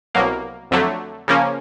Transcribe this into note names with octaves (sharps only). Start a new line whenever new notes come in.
C2 B2 F#3 A#3
F2 D3 F#3 A3
C#3 F3 A#3 C#4